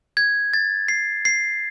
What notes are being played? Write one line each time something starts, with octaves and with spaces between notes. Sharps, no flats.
G#6
A6
C7
C7